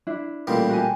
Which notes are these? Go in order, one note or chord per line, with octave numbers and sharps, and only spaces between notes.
D4 E4
A1 A#2 G3
F#4 G4 G#5